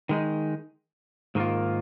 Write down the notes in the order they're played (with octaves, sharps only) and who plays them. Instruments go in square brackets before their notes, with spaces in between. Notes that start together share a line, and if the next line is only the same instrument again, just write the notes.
[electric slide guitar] D#3 G#3 D#4
G#2 D#3 A#3 F4